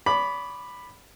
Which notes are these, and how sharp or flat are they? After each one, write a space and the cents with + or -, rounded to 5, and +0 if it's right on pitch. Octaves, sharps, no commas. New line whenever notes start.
D5 -45 B5 +0 D6 +25